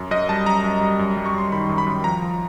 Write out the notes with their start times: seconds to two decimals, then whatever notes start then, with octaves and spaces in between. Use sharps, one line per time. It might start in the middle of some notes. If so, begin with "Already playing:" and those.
Already playing: F#2
0.11 F#2 D#5
0.29 G3 A5
0.46 F#2 A#5
0.64 F#2
0.81 G3
0.99 F#2
1.17 G3
1.26 C#6
1.34 F#2 C6
1.52 D#3 B5
1.69 F#2
1.78 B5
1.87 F#2
2.04 F3 A#5
2.22 F3